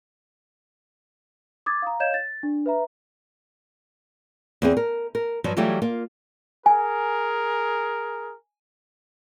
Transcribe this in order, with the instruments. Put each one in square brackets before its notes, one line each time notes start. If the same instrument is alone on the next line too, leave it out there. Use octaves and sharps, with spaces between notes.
[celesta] D6 D#6 G#6 A6
F5 A#5
C#5 D#5 F5 G6 G#6 E7
A6
D4
B4 E5 A#5
[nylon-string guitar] E2 C4 G#4
A#4
A#4
G2 F3 F#3
E3 F#3 G3 A3 F4 G4
A#3 F4
[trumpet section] G#4 A#4 [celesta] G#5